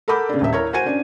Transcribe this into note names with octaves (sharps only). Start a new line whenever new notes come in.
A4 A#4 F#5 B5 D6 G6
C#3 D4
D#1 E5
E4 A#4 C#5 G#6
F#4 C5 G#5 G#6 D#7
C#4 D4